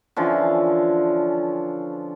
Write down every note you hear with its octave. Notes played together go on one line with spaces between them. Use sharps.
D3 E3 F3 C#4